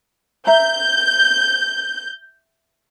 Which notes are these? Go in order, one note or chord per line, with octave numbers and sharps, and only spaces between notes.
E5 A#5 G6